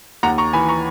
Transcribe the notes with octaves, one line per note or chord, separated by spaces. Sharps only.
D#2 F#5 A#5
A#5 C#6
E3 G#5 B5
A#5 C#6